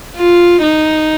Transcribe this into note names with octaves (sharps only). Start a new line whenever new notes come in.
F4
D#4